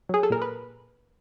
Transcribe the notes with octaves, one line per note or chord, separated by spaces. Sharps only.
F#3 G#4
A4
A#2 A#4
B4